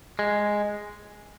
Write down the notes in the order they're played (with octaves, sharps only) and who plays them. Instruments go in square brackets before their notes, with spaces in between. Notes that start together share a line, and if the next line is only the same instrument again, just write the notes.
[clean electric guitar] G#3